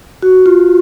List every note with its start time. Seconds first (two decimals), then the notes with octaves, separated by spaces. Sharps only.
0.22 F#4
0.46 F4